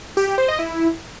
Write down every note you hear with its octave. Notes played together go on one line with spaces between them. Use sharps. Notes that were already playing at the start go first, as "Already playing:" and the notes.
G4
G4
C5
D#5
E4